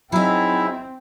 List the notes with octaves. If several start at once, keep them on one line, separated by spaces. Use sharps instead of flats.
F#3 C4 D#4 E4 G#4 E5